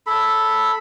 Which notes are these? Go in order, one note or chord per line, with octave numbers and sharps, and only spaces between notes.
A4 B5